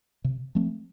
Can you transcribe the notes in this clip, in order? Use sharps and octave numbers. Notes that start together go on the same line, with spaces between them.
C3
F3 A3 C4